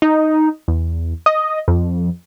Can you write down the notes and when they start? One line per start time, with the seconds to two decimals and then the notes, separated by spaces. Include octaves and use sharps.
0.02 D#4
0.68 E2
1.26 D#5
1.68 F2